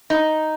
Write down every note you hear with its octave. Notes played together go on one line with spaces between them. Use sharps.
D#4